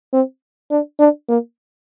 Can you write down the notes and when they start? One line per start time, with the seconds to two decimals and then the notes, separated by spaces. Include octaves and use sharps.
0.13 C4
0.71 D4
0.99 D4
1.28 A#3